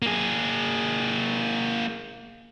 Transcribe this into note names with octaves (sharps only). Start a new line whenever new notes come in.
A#3 G#4